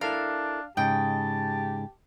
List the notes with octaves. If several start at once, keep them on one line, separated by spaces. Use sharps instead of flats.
D4 E4 A4 A#4 F5
G#2 C#3 G4 D#5 G5 A5